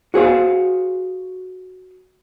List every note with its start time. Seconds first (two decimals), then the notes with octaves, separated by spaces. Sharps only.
0.14 F#4 G#4 C5 F5